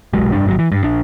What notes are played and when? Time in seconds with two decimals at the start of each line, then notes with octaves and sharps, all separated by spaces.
0.13 E1 B1 F#3 G#3
0.32 F1 G2 D4
0.46 G#1 C3 F#3
0.59 E3
0.72 G2
0.84 A#1 D4